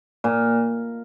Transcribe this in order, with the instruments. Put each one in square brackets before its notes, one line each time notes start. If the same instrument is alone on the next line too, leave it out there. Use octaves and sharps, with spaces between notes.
[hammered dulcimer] A#2